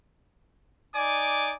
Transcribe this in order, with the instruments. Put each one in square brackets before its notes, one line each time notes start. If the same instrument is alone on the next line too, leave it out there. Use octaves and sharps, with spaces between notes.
[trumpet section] D#4 D5 G#5 D6